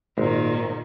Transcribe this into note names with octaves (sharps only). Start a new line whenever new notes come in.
G#1 A#2 D#3